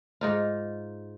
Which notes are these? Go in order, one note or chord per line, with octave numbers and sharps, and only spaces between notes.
G#2 D#4 F4